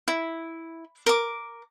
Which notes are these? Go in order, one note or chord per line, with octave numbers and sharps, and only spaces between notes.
E4
A#4 D6